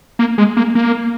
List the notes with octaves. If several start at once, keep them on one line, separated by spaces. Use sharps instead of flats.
A#3
G#3
A#3
A#3